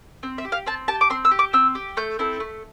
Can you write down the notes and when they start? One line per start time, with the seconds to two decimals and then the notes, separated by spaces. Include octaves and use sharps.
0.23 C4
0.38 E5
0.45 G4
0.52 F5
0.66 C4 A5
0.88 G4 A5
1.01 D6
1.10 C4 C6
1.25 E6
1.31 G4
1.39 D6
1.53 C4 E6
1.75 G4
1.97 A3 G6
2.19 C4 E4 A4
2.40 A3